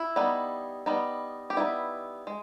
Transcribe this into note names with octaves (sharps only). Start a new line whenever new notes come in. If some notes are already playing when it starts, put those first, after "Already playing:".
Already playing: E4
G3 B3 D#4
G3 B3 D#4
G4
G3 B3 D#4 E4
G#3